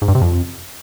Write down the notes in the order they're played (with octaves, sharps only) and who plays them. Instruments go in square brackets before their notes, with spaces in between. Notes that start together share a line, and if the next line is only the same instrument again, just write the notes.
[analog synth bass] G#2
G2
C3
F2